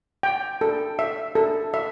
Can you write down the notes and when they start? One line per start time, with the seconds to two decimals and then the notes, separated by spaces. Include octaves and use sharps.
0.23 G5
0.61 A4
0.99 E5
1.35 A4
1.74 E5